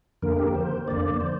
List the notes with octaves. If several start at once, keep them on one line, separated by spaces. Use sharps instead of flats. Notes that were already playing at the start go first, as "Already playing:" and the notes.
F2 D3 A#3 A#4
G4
A#4
C5
F2 D3 A#3 D5
C5